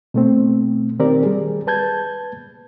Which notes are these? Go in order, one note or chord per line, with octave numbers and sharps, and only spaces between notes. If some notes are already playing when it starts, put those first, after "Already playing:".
B2 A3 C4
D#3 C4 G4 A#4 D5
G3 G#4
B4 A5 G6 G#6